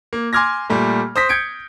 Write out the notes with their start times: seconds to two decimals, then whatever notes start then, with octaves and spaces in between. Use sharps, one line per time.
0.13 A#3
0.33 G#5 C6 D6 F6 G#6 A#6
0.70 A#2 G3 A3
1.16 C5 D#6 A#6 B6
1.29 G6 G#6 C#7 D7